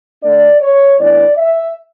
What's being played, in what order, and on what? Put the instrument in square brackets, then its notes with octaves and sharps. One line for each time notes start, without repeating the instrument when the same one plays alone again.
[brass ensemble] D3 A3 D4 D5
C#5
A2 E3 B3 D4 D5
E5